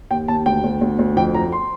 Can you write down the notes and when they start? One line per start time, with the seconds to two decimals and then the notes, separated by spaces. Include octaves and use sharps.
0.11 D#2 G5
0.28 D#2 A5
0.46 D2 G5
0.64 D2
0.81 D2
0.99 D2
1.16 F2 G5
1.34 F2 A#5
1.52 C6